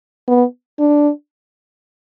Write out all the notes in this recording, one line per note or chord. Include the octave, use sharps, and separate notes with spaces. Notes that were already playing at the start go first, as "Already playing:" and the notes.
B3
D4